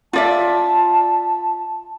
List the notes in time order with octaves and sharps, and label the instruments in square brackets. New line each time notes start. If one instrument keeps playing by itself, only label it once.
[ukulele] F4 D5 E5 [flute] A5